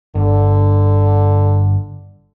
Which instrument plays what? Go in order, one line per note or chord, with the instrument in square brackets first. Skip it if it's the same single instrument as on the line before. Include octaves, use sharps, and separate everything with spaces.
[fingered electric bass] G1 [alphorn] D3